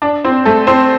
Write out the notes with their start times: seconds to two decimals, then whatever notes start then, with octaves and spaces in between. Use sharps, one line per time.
0.02 D4 D5
0.24 C4 C5
0.45 A3 A4
0.67 C4 C5